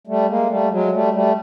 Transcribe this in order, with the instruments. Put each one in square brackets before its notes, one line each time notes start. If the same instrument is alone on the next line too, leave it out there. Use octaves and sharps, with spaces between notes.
[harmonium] G3 A3
G#3 A#3
G3 A3
F#3 G#3
G3 A3
G3 A3